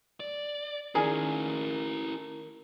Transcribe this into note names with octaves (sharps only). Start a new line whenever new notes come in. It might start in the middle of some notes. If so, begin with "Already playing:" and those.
D5
D#3 C#4 E4 G#4 A#4 D5 G#5